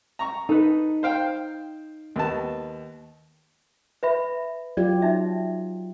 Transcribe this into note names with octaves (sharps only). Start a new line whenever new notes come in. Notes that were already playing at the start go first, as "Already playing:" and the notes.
A#5 C#6
D#4 A4 B4
C5 F5 G5
D#2 B3 A5
B4 E5 B5
F#3 F4 G4 D5
D#4 E5